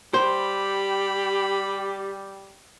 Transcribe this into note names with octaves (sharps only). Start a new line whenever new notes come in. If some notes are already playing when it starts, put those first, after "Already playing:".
G3 G4 C5 B5